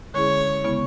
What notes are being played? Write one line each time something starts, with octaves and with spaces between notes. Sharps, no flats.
D3 G#3 C#4 E4 G#4 C#5
C#3 G#3 B3 E4